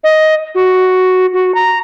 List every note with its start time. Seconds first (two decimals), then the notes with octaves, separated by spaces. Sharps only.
0.04 D#5
0.55 F#4
1.33 F#4
1.54 A#5